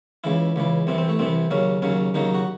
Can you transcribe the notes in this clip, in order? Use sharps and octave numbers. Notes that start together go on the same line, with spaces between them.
C#2 C#3 E3 E4
C#2 C#3 E3
C2 C3 E3 C4
C4
A3
C2 C3 E3 C4
D#2 C#3 F#3 C#4
D#2 C#3 F#3 C#4
D#2 C#3 F#3 D#4
F#4